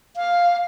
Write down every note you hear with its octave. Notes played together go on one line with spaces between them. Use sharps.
F5